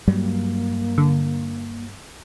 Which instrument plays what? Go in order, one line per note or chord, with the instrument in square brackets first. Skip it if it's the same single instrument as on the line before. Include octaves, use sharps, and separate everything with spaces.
[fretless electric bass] G2 F#3 G3 [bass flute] A#3
[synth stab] D3